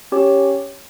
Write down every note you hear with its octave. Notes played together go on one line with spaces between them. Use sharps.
C#4 G4 C#5